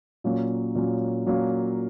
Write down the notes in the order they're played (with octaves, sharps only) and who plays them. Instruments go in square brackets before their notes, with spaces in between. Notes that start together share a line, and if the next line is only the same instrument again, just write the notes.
[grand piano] A#2 F#3 A#3 C#4
A#2 F#3 A#3 C#4
A#2 F#3 A#3 C#4